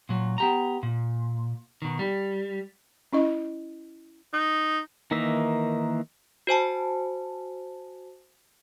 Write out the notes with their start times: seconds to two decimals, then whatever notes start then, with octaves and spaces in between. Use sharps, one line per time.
0.09 A#2 F#3
0.38 B3 G4 A#5
0.83 A#2
1.82 B2 D#3
1.99 G3
3.13 C#4 E4 D#5
4.33 D#4
5.11 D#3 E3 A#3 D#4 E5
6.47 F#4 C5 G#5 A5